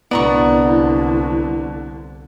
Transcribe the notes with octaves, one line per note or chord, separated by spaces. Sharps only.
C2 D3 B3 E4 D5 A#5 C#6